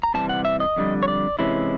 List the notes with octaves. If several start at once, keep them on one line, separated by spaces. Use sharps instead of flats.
A#5
C3 E3 G3 A5
F#5
E5
D#5
F2 D3 G3
C#5
D5
C3 E3 G#3 C#4 E4